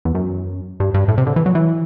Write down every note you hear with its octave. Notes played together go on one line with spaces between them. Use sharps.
E2
F#2
G2
G2
A2
C3
D3
E3
F#3
E3